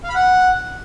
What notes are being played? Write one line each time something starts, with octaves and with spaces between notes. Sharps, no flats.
F5
B5
F#5